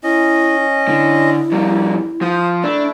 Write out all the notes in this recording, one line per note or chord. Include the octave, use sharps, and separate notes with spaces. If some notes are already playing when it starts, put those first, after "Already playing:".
C#4 E4 D#5
D3 E4
F2 G3 A#3
F3 C5 D#6
A3 D4 E4